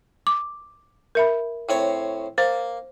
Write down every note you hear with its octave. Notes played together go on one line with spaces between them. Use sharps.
D6
A#4 E5 B5
A2 C4 C#5
A#3 C5